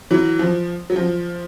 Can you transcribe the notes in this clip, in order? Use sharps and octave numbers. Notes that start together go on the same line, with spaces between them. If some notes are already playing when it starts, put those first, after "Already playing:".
E3 F#3
F3
F#3
F3